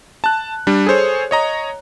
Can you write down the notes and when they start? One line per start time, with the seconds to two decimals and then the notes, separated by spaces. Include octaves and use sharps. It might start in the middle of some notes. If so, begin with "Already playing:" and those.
0.24 A5 F#6
0.67 G3 D4
0.86 G#4 A4 C5 C#5
1.31 C#5 D#5 A#5